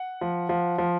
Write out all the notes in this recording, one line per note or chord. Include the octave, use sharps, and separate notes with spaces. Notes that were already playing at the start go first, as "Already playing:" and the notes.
Already playing: F#5
F3
F3
F3